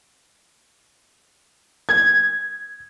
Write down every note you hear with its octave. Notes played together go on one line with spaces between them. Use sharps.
G#6